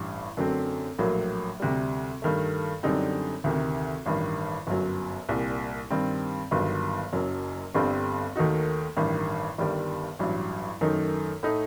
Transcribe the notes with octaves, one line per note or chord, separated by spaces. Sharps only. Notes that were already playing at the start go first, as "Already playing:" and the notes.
Already playing: A1 G2
F#2 D3 F#3 A3 C4
A#1 A2 F#3 A#3
D2 C3 G3
G2 D#3 A3
F#2 D3 G3 C4 D#4
D2 C3 D#3
A1 G2 D#3
G1 F#2 F#3
C2 A#2 G3
G2 D#3 G3 C4
G1 G2 D#3 F#3
F#1 F#2 F#3
G1 G2 D3 G3 C4
D#2 D#3 A3 D#4 F#4
A1 G2 D#3
G1 G2 D#3 G3
A1 G2 F#3
F#2 D#3 A3 D#4
A2 A3 D#4